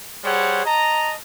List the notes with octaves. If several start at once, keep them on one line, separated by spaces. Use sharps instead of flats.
G3 G#4 C5 C#5 F#5
D#5 A5 A#5